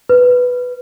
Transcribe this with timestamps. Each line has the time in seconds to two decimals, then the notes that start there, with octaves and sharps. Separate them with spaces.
0.09 B4